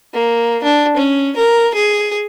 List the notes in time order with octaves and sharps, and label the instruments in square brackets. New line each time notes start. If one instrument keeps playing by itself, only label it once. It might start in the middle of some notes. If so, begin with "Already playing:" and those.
[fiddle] A#3
D4
C#4
A#4
G#4